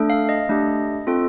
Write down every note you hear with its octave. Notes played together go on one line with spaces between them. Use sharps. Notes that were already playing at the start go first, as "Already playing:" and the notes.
Already playing: A3 D4 A4
F5
D#5
A3 D4 G4
C4 F4 A4